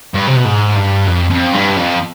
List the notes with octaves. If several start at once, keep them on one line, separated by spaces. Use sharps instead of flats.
G2
C3
B2
G#2
G2
F2
F2
G2
F2